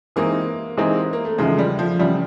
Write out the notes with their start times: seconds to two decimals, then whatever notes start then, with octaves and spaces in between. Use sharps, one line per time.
0.16 E3 G#3 A#3 C4 D#4
0.77 E3 G#3 C4 D#4
1.13 A#3
1.25 A3
1.38 E2 C#3 F3 G#3 A3
1.58 G3
1.79 F3
1.99 E2 C#3 F3 G3 A3